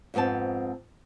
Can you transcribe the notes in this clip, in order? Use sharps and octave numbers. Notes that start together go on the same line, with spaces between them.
F2 G#2 B3 C4 A5